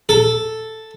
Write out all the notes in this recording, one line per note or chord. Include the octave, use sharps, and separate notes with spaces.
A4